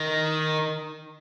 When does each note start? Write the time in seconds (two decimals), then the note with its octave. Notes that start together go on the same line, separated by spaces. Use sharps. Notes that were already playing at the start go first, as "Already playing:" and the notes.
Already playing: D#3